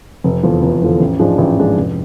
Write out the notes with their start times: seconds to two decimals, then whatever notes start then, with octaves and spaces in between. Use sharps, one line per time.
0.24 F1
0.43 E2 D3 F3
0.62 F1
0.81 E2 D3 F3
1.00 A1
1.19 G#2 F3 G#3 D4
1.38 A1
1.57 G#2 F3 G#3 D4
1.76 F1